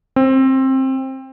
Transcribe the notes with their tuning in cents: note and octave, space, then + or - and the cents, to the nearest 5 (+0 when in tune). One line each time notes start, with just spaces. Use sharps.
C4 +20